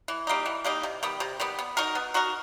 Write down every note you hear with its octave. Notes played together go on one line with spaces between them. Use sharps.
E3
G3 A#3 D#4
E3
G3 A#3 D#4
C3
D#3 G3 B3
C3
D#3 G3 B3
B3
D#4 F#4 A#4
B3
D#4 F#4 A#4